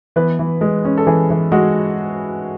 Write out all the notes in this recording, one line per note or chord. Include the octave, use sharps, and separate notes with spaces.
E3 B3 B4
E3
G#3
C#4
A4
E3 G#4
E3
G#3 F#4